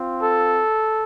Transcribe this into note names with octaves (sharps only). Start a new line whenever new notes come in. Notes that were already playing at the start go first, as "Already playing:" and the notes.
Already playing: C4 F4
A4